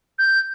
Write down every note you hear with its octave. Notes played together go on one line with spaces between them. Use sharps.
G6